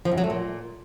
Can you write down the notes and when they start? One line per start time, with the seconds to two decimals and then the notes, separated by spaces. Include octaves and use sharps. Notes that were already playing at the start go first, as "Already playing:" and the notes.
0.05 F3
0.11 F#2
0.18 F#3
0.24 A3
0.30 A#2